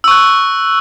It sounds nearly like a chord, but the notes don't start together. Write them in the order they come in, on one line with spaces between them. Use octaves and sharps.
E6 C#6 F#6